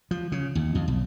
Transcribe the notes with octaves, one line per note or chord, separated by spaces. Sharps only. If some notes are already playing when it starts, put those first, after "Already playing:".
F3
C#3
D#2
F2
B1